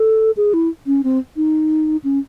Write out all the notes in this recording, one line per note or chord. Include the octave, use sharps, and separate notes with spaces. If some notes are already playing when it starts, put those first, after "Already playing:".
Already playing: A4
G#4
E4
C#4
C4
D#4
C#4